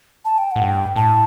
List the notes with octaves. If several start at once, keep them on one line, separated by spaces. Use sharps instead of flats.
A5
G5
A2 F#5
G2 G5
A2 A5